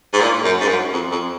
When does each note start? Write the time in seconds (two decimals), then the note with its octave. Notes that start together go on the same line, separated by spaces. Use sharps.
0.13 G#2
0.20 A#2
0.44 F#2
0.60 G#2
0.68 F#2
0.93 F2
1.12 F2